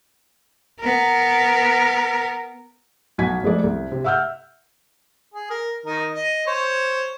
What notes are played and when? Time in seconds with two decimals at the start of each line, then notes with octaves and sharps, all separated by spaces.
0.80 B3 A#4
3.18 B1 F#4 G#5 G#6 B6
3.43 F2 G#3 A3 D5
3.64 C2
3.91 C3
4.04 E5 F#5 E6 F6 G6
5.34 G#4
5.50 A#4
5.86 D#3 D#4 A#4
6.14 D#5
6.47 C5 C#5